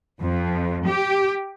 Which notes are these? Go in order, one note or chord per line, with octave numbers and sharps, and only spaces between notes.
F2
G4